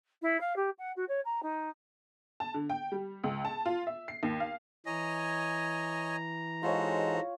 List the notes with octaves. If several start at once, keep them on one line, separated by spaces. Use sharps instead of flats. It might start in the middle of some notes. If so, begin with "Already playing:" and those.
E4
F5
G4
F#5
F#4
C#5
A#5
D#4
A5
D3
G5
G3
C#2
A5
F4
E5
C7
D#2
F5
E3 C#5 D#5 G#5 A#5
G#2 G#3 F4 F#4 A4 C5 C#5